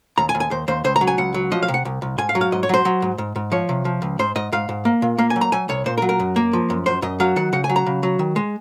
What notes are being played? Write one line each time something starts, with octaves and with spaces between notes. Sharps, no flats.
D#2 A#5
G#5
D#2
G#5
D#2 C5
D#2 C5
C#2 C5
A#5
F#3
G#5
C#2 F#5
F#3
F3 D#5
F5
C3
F#5
C2
C2
G#2 G#5
F5
F#3
F5
G#2 D#5
C#5
F#3 C5
F#3
G#2
G#2
G#2
F3 C#5
C3
F3
C#2
G#2 C5
G#2 D#5
G#2 F5
G#2
A#3
A#2
A#3 F5
G#5
F#3
A#5
F#3 G#5
C2 C#5
A#2 C5
A#4
F#3
A#4
F#2
A#3
F3
F#2
F#2 C5
F#2 D#5
F#3 F5
D#3 F#5
C#3 F#5
G#5
F#3
A#5
C#3
F#3
D#3
G#3